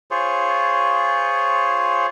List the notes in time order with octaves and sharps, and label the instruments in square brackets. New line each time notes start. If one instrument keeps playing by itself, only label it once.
[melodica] F4 G#4 C5 C#5